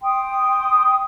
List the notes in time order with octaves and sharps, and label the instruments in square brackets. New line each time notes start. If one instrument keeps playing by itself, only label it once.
[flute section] G5 C6 D#6